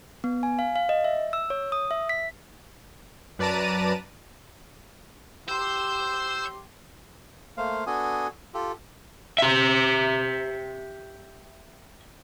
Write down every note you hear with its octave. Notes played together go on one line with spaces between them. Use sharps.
B3
G#5
F5
F5
D#5
E5
E6
C#5
D#6
E5
B6
F#2 B4 D5 A5 A#5 D#7
G4 C5 C6 E6 G6
A3 A#3 C5 F5
B3 D4 F#4 A4 G#5 D#6
F4 G4 A4
G4 E5